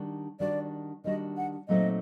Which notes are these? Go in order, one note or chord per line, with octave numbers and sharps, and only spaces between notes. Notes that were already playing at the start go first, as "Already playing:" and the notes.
Already playing: D#3 G3 D4 F#4
D#3 G3 D4 F#4 D5
D#3 G3 D4 F#4 D#5
F#5
A#2 F#3 A3 C4 D#4 D#5